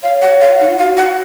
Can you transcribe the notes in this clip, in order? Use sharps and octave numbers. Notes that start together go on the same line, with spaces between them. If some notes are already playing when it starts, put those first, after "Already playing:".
C#5 F5
F#5
F5
D#4 F#5
F4
F#4 F5
F#5